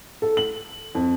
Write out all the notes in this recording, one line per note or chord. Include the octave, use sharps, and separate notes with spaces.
A4
F#7
F2